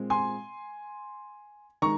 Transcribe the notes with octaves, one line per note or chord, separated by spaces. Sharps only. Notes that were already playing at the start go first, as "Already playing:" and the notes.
Already playing: A#2 G#3 C4
G#5 C6
D#3 G#3 A#5 C#6